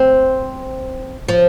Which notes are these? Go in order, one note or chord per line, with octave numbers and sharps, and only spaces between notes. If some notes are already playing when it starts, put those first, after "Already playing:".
Already playing: C4
F3